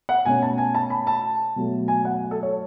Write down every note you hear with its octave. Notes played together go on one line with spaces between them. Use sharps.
F#5
B2 A3 C#4 G#5
A5
G#5
A5
B5
A5
B2 F#3 A3
G#5
F#5
A4
C#5